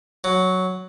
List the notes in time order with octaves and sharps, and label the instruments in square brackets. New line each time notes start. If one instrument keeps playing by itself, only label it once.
[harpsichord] F#3